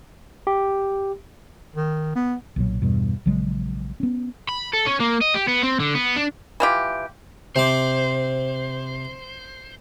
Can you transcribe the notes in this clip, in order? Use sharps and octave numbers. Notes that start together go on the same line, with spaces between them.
G4
D#3
B3
B1 A#2 F#3
E2 G2 B2
A#1 C#3 F#3 G#3
B3 C#4
B5
A4
C#4
A#3
D#5
G4
B3
C4
D3
B3
D4
E3 F4 G4
C3 C4 C5 D6